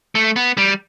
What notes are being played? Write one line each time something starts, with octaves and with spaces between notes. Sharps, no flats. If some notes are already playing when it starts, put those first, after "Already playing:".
A3
B3
G3